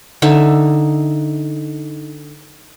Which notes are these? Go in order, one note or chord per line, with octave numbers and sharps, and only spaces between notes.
D3 D#4 E5